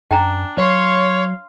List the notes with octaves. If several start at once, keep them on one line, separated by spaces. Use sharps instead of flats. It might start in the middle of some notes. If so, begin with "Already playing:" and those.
F#2 D4 G5 G#5 A#5
F#3 C#5 F5 C6